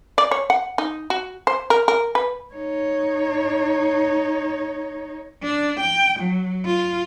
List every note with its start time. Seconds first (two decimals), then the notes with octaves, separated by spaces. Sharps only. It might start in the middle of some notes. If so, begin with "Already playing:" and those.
0.18 D5
0.31 C#5
0.50 F#5
0.78 D#4
1.10 F#4
1.47 C5
1.70 A#4
1.88 A#4
2.15 B4
2.54 D#4 C#5
5.43 D4
5.80 G5
6.20 F#3
6.66 F4